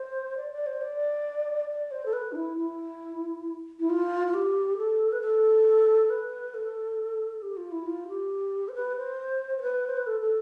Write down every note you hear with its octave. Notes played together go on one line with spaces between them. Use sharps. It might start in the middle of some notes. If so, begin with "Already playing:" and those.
Already playing: C5
D5
D5
C5
D5
D5
C5
A4
B4
D4
E4
E4
E4
F4
F4
G4
A4
B4
A4
B4
A4
G4
F4
E4
F4
G4
C5
B4
C5
C5
B4
C5
B4
A4
A4